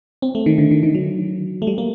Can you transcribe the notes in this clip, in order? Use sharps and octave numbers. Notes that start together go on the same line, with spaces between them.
C4
A3
D#3
D3
D#3
D#3
F#3
A3
G3
A#3